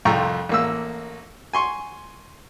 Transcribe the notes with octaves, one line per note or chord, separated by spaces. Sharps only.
C2 F2 F4 G5 A#5 C#6
A1 A#3 E6
G#5 C6 C#6